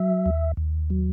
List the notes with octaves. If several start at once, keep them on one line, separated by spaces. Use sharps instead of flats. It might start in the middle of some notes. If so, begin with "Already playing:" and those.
Already playing: F#3 E5
D#2
D#2
F#3